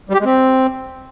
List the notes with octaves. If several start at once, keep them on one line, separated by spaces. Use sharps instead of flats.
G3
G4
G#3
C4